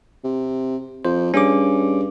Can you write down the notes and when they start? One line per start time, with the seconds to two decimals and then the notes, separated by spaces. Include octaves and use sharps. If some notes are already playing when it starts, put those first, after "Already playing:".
0.24 C3
1.05 F2 C5
1.34 G2 C#4 G#4 D6